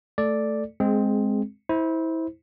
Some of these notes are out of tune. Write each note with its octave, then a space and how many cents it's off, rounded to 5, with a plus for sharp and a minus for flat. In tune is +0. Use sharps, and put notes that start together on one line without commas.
A3 +0 A4 +0 D5 +0
G#3 +0 C4 +0 G#4 +20
E4 -25 C5 +0